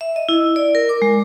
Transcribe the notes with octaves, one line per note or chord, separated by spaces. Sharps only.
E5
D#5
E4
D5
A#4
D6
G#3